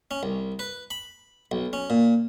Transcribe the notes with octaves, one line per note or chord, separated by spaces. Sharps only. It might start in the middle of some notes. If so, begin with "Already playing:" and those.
C#4
C2
B4
B5
B1
C#4
A#2